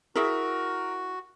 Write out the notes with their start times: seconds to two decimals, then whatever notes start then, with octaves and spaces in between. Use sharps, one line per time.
0.16 E4 F#4 G#4 A#4 E5